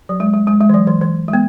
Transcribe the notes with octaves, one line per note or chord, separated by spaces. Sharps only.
F#3
G#3
G#3
G#3
G#3
E3
F#3
E3
E3
G#3
B3